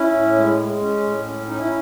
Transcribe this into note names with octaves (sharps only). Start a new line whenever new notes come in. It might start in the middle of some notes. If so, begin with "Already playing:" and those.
Already playing: C#4 E4
A2
G#3
G#3
C#4
A2
C#4
C#4 D#4
E4